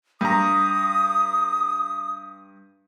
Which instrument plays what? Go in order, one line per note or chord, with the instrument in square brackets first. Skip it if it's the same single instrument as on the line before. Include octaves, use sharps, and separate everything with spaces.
[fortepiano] G2 A#5 [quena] D#6